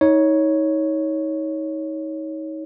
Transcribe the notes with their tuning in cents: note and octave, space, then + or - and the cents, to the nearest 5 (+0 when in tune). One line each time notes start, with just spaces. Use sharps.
D#4 +30 C#5 +0